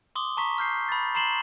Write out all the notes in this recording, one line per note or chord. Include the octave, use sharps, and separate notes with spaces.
C6 D6 D#6 G7
A5 A#5 C#6 B6
F6 G6 C7
B5 A6
A#5 C6 C7 E7 F#7 G7